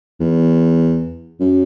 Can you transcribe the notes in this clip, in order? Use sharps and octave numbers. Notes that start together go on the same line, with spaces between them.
E2
F#2